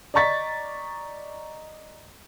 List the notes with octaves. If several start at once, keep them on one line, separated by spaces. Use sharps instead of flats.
D5 D#5 A#5 C#6 A6 B6